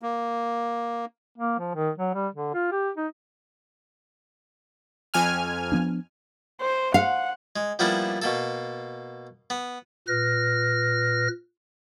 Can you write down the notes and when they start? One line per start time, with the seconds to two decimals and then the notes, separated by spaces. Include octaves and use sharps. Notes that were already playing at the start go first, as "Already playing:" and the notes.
0.02 A#3
1.38 A#3
1.59 F3
1.75 D#3
1.98 F#3
2.14 G3
2.35 D3
2.54 F4
2.72 G4
2.97 D#4
5.14 F2 G#5 F6
5.72 F3 B3 D4
6.61 C5
6.94 F5 F#5
7.56 G#3
7.79 F3 G3 A#3 B3 D4 E4
8.22 B2 A#3 A4
9.50 B3
10.08 A#2 B4 F6 A#6